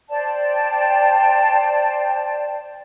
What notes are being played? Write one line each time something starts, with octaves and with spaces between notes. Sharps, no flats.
C5 D5 G5 A5